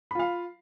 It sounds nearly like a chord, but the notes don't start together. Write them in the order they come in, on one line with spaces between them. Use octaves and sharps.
B5 F4 F5